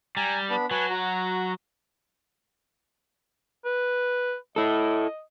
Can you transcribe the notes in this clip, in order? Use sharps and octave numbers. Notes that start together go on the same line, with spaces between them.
G3 G#5 A#5
B3 D4 B5
F#3 B4 G#5 A5
F#4 A#5
B4
E4 A4 D#5